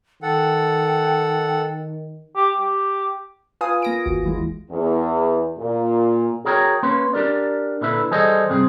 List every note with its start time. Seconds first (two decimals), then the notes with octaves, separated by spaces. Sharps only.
0.22 D#3 A4 F#5 G5
2.36 G4
2.58 G4
3.61 F4 B4 F5 G#5 D#6
3.82 A#3 A#6 D7
4.05 G1 D#2 F#4
4.25 E3 G#3
4.71 E2
5.59 A#2
6.45 F#4 G#4 A#4 C#5 G5
6.83 A#3 C#4 B4 C6
7.13 D4 G4 A#4 D5
7.81 A#2 D3 E4 B4 E5
8.11 E3 G3 G#4 A4 C5 D#5
8.50 C2 G2 C4 G#4